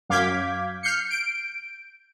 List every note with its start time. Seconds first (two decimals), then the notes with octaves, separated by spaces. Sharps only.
0.09 F#2 F5 D6 G6 G#6 B6
0.83 F6 G6 C7 C#7
1.10 G6 D7